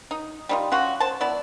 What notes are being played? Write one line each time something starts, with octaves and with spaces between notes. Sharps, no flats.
D#4
G3 D#4 F4
C#4 F4 F#4
C5 A5
B3 E4 D5